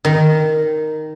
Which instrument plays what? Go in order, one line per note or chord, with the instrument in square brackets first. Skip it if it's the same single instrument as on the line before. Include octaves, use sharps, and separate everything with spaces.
[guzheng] D#3